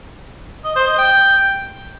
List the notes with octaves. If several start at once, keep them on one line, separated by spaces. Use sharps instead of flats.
D#5
C5
D#5
G5